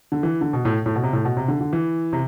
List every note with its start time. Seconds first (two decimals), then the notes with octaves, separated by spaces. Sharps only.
0.12 D3
0.23 E3
0.41 D3
0.53 B2
0.65 A2
0.86 A2
0.95 B2
1.03 C3
1.13 A2
1.25 B2
1.37 C3
1.48 D3
1.61 D3
1.73 E3
2.13 C3